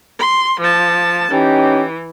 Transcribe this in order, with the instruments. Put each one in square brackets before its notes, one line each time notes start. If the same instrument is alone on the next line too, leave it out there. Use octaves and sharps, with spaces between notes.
[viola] C6
F3 A5
[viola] E3 [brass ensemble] C#4 D#4 G4